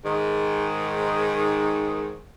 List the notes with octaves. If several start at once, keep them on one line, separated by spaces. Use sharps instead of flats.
G#2 D#3